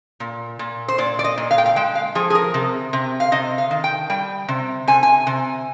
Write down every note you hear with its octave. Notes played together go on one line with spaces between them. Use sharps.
A#2
A#2
C5
A#2 D5
D5
D#5
A#2
F5
G5
F5
G#3 G5
F5
F3 G#4
G#4
A#4
C3
C3
F5
C3 D#5
F5
D#3
G5
G3 G5
C3
C3 G#5
G#5
C3